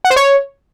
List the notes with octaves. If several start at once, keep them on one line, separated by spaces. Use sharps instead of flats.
F#5
C5
C#5